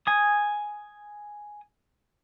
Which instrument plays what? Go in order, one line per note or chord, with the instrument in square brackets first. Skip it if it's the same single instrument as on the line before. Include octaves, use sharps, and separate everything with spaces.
[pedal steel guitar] G#5 D#6